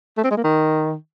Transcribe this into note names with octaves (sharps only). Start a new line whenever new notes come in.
A3
C4
G#3
A#3
D#3